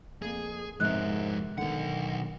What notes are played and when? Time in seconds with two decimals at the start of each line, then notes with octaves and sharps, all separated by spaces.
0.22 F2 A#3 G#4
0.80 F2 G#2 C3 G#3 B3 A#4 F#6
1.58 B1 D3 D#3 B3 F#5